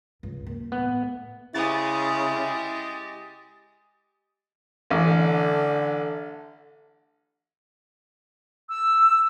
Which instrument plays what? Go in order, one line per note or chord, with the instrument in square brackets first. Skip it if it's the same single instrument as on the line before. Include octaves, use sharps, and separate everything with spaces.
[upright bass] C#2 G2
A#3
[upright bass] A1 [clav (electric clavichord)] B3
[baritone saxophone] C#3 [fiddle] G#3 G4 [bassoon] E4 [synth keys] D#6 A6
[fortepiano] A1
[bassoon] D3
[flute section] E6